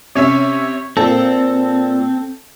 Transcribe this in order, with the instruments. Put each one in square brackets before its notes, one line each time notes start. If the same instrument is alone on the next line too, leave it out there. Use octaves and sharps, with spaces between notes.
[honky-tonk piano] C3 C#4 E5 [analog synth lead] C#5
[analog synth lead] A#2 [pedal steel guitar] C4 [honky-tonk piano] A4